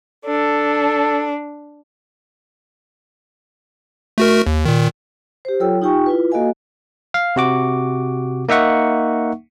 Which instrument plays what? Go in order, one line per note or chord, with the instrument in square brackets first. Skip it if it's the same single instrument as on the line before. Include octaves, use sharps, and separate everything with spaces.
[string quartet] D4 [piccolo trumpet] A4
[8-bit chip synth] A3 F#4 A#4
D#2
A#2 D#3
[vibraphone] G4 C5
F#3 F4 A4 C#5 G5 E6
D#4 F4 G4 G5 G#5 C#6
E4 F4 B4
A#3 F#4 A4 D#5 F5 G#5
[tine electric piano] F5
C3 F#4 D6
A#3 D#4 E5 F#5 C#6